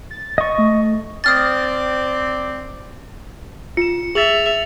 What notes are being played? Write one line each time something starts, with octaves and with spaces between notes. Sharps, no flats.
A6
D#5 C#6
A3
C4 D5 D#6 F6 A6
F4 C#7 E7
G#4 E5 A6 F7 F#7